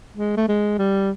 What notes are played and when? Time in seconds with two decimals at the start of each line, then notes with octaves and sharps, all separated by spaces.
0.17 G#3
0.37 A3
0.48 G#3
0.78 G3